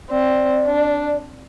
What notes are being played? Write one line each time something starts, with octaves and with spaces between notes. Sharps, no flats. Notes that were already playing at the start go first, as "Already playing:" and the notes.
C4 D5
D4